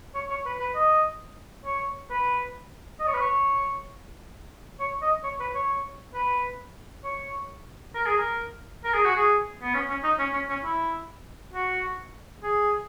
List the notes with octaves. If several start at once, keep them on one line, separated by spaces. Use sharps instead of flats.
C#5
C#5
B4
B4
D#5
C#5
B4
D#5
C#5
B4
C#5
C#5
D#5
C#5
B4
C#5
B4
C#5
A#4
G#4
A#4
A#4
G#4
F#4
G#4
B3
C#4
C#4
D#4
C#4
C#4
C#4
E4
F#4
G#4